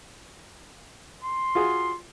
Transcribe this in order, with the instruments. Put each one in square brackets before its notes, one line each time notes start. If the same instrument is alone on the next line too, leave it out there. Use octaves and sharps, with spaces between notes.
[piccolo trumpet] C6
[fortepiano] F4 F#4 G#4